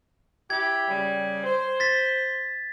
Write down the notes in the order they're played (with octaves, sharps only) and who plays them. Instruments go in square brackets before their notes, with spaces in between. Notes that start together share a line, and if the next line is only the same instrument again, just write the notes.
[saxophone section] E4 G4 [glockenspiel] G#6
[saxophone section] C#3 G3
C5
[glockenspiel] A6 B6